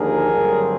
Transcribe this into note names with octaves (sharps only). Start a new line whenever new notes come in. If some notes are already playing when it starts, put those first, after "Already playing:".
Already playing: D#2 D3 F3 G#4 A#4
G2 D3 F#3 A3 C4